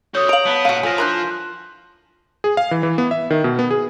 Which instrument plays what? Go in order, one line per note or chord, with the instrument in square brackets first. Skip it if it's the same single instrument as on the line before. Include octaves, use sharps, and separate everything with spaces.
[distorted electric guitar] F#4 A4 [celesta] C#5 D#6 [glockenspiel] G6
[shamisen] D#5 F5 [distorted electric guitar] A#5 [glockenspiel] D7 F#7
[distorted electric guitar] B3 [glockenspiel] A5 B6
[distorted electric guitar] A#2 F#5 [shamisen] F#4 F5 [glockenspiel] D#7
[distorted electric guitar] F3 [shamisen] A4 [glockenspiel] G#5 A#6
[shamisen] D4 E4 A#4 [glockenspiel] C6 F#6 G6
[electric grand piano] G#4
F5
E3
E3
B3
E5
D#3
B2
B3
G#4